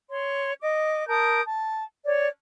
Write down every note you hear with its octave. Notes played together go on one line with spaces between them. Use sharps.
C#5 C6
D#5 D6
A#4 A5 D#6 G6
A5
C#5 D5